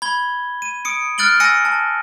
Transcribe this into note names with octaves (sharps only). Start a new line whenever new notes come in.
B5 G#6 G7
D#7
D#6 C#7 D7
F6 F#6 A6 D7 F#7 G7
G#5 E6 A#6 C#7 D#7
A5